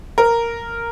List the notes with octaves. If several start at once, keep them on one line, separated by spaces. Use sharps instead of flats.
A#4